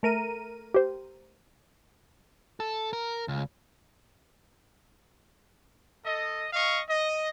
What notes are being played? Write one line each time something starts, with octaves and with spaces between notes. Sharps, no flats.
A3 A#4 D#7
G4 C5
A4
A#4
C#2
A4 D#5
D#5 F5 C#6
D#5